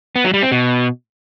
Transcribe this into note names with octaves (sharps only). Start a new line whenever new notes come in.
B3
F#3
G3
C4
B2